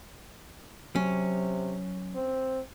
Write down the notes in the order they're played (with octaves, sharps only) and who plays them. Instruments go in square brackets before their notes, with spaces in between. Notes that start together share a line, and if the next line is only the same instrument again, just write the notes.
[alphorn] C3 [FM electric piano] F#3 [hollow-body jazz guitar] C#4
[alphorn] C4